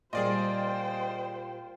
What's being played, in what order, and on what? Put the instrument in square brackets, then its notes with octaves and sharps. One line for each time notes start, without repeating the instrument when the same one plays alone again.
[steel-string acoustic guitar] A#2 G3 [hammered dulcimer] F4 [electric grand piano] G#4 D5 D#5 [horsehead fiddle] C5 G5